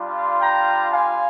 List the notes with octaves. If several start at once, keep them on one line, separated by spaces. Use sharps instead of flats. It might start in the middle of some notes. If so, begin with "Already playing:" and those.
Already playing: G3 D4 F4
G5 A#5
F5 G#5